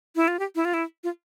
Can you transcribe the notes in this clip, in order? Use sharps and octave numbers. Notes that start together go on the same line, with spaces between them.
E4
F4
G4
E4
F4
E4
F4